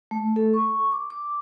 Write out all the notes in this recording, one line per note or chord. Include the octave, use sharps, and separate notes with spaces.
A3
A4
C#6
D6
D6